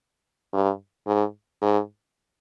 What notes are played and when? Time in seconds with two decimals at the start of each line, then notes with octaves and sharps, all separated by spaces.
0.54 G2
1.07 G#2
1.62 G#2